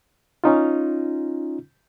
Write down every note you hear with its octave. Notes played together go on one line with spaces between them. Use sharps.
C#4 D#4 F4